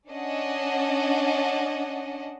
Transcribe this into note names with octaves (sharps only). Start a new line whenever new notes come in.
C#4 D4 D#5 F#5